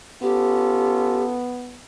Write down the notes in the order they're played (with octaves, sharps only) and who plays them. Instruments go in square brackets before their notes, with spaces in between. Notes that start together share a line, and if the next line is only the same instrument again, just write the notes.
[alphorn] B3 [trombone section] C#4 F4 A4 [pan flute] G4